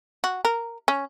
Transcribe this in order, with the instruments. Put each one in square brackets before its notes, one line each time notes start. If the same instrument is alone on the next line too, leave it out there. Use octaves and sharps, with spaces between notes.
[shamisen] F#4
A#4
C#4